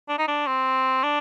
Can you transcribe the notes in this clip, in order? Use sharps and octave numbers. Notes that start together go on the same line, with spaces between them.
D4
D#4
D4
C4
D4